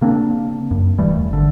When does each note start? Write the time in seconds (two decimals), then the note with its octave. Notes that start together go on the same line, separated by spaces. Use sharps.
0.01 C#3 A#3 C4 D4
0.71 F#2
0.98 D1 E3 G3 A3
1.13 D#2
1.31 G#1 D3